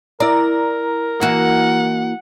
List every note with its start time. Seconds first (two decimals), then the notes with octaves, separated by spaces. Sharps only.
0.20 E4 A#4 D5 A#5
1.21 E3 A#3 F#4 F#5